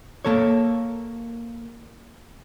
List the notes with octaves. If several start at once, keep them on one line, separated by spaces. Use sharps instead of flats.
A#3 A4 C#5